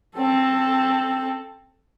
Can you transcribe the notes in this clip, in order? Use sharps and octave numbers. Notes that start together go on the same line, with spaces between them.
C4 A4